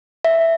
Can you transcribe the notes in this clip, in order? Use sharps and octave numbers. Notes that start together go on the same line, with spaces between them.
E5